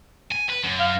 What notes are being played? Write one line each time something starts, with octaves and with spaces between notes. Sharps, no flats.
G#5
B4
F#2
F5